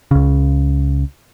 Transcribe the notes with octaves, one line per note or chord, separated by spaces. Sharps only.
C#2 C#3